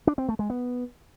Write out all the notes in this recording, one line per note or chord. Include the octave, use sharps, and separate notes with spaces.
D4
C4
A3
G#3
B3